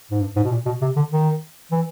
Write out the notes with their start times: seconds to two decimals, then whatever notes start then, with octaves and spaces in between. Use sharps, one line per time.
0.11 G#2
0.21 G2
0.36 G#2
0.44 B2
0.51 A#2
0.65 B2
0.81 C3
0.96 D3
1.11 D#3
1.72 E3